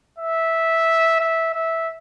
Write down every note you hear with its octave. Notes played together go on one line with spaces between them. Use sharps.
E5
E5
E5